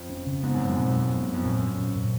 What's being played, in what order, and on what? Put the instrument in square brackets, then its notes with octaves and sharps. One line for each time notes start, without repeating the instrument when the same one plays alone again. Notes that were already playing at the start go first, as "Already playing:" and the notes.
Already playing: [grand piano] F2
[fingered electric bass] C#4
C#3
[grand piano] G#2 [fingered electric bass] B3
[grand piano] F#2
[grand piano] F2 [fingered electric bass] G#3
[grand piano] F#2 [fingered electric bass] B2
[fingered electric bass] G#3
B3
B3
[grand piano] F2
[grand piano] F#2 [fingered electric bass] A#2
[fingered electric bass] C#4
A#2
A#2